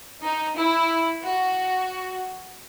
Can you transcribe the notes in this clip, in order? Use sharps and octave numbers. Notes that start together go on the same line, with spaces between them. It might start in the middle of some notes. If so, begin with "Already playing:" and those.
D#4
E4
F#4